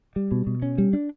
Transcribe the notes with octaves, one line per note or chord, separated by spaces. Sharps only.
G3
B2
B2
C#4
G3
D4